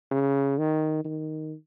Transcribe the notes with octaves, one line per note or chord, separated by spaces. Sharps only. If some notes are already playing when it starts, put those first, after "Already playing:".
C#3
D#3
D#3